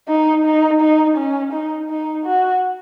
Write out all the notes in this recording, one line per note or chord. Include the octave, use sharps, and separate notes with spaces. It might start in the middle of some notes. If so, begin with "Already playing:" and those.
D#4
D#4
D#4
C#4
D#4
D#4
F#4